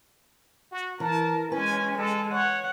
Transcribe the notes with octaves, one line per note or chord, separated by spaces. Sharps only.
F#4
E3 A#4 A5
G#3 C#4 B4 G#5
G#3 A4
C#5 F#5